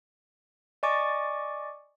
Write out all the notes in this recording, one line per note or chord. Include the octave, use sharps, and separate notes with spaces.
D5 D#5 G#5 C#6 D6 A6